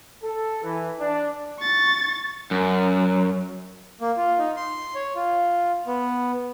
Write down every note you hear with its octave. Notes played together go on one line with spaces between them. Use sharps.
A4
E3
D4
C#6 A6
F#2
A#3
F4
D#4
C6
C#5
F4
B3